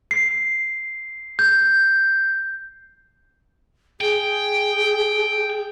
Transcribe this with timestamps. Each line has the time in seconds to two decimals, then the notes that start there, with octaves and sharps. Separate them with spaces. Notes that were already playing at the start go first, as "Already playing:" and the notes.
0.11 C7
1.39 G6
4.01 G#4 G5